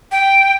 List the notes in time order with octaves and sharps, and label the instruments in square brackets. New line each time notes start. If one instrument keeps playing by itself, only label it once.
[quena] G5